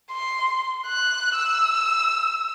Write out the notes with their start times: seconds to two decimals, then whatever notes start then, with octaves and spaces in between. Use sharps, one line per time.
0.12 C6
0.87 F#6
1.35 E6